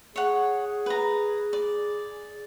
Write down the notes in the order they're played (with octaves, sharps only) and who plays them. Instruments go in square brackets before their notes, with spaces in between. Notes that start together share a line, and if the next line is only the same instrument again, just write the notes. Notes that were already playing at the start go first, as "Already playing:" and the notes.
[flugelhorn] G#4 [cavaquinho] C#5 F#5
[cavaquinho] B4 A#5
D5